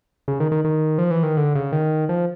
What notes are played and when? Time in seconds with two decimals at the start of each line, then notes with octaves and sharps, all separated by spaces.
0.28 C#3
0.40 D#3
0.52 D#3
0.65 D#3
0.98 F3
1.11 E3
1.23 D#3
1.37 D3
1.55 C#3
1.72 D#3
2.09 F3